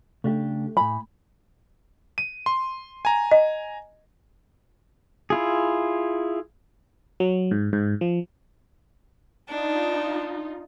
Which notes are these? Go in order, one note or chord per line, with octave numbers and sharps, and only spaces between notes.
C#3 A3 D4 G4
A2 G#5 B5
D#7
C6
G#5 A#5
D#5
E4 F4 G#4
F#3
G#2
G#2
F3
D4 D#4 F4